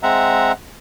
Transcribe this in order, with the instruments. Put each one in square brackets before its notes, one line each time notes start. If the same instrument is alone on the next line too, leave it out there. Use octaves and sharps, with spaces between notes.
[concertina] G#3 C4 E5 F#5 A#5